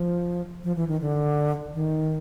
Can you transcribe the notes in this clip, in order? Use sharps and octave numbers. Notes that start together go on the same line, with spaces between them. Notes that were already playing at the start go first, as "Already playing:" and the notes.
Already playing: F3
F3
E3
D#3
D3
D#3